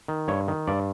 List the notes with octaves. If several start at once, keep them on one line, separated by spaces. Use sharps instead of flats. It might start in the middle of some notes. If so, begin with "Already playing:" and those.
D#3
G2 C#5
D#3
G2 D5